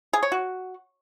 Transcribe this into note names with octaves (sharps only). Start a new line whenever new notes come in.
G#4
C#5
F#4